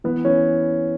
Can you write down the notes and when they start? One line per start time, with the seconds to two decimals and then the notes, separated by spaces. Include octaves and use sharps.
0.04 E3 B3
0.25 E3 C#4